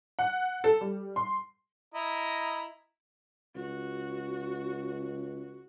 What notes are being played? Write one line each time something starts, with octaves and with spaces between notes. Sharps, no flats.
F#5
A4
G3
C6
E4 D#5 A#5
C#2 F#4